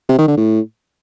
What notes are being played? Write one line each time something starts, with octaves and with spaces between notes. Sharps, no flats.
C3
D#3
D3
A2